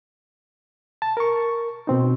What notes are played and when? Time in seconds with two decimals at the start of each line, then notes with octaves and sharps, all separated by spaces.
1.02 A5
1.17 A#4 C#6
1.87 B2 C4 D#4